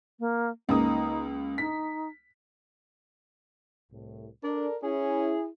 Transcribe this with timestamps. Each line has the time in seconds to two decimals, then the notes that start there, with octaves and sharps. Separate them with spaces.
0.20 A#3
0.69 C#2 A#3 D#4 D#6
1.58 D#4 B6
3.91 C2 A2
4.44 D4 A4 A#4 D5
4.83 C#4 E4 G#4